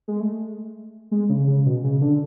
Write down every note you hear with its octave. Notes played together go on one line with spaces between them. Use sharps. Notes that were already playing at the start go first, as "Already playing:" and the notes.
G#3
A3
G#3
C#3
C#3
B2
C#3
D3